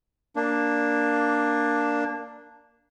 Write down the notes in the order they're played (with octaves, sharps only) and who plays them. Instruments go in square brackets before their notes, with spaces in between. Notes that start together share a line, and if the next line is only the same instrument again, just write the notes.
[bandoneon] A#3 D4